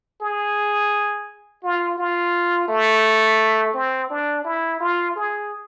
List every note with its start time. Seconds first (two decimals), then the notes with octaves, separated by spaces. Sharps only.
0.22 G#4
1.63 F4
1.98 F4
2.69 A3
3.74 C4
4.10 D4
4.45 E4
4.81 F4
5.16 G#4